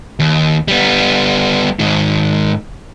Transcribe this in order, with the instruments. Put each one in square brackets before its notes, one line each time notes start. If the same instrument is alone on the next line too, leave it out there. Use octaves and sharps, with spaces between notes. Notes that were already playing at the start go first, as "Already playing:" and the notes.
[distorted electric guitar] D#2
G3 B3
G#2 D#3